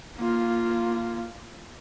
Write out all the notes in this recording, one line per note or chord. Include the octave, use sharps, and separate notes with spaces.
A#3 F4